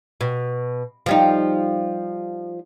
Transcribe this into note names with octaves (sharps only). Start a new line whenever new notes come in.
B2
F3 G3 D#4